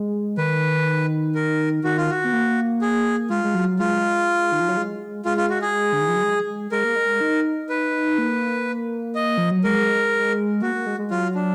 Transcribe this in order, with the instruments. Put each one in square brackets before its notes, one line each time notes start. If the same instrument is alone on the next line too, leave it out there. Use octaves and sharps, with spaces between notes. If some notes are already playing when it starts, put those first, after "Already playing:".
Already playing: [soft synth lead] G#3
[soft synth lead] D#3 [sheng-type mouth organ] B4
[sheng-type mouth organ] A#4
[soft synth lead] D#3 [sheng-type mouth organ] F#4
[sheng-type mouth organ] F4
F#4
[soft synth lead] B3
A#3
[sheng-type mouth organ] G#4
[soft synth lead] G#3 [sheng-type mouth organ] F4
[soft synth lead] G#3
F#3
[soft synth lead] G#3 [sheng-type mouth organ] F4
[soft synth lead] D#3
F3
F#3
G#3
[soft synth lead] G#3 [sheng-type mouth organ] F4
[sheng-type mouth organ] F4
F#4
G#4
[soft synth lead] D3
D#3
F3
F#3
G#3
[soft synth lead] G#3 [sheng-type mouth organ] A#4
[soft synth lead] A#3
G#3
D#4
[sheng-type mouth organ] B4
[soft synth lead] A#3
[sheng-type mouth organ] D#5
[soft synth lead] F3
F#3
[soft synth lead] G#3 [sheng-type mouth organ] A#4
[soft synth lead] A#3 [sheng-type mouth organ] F#4
[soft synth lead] A#3
G#3
G#3
[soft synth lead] F#3 [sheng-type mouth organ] F4
[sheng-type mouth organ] D4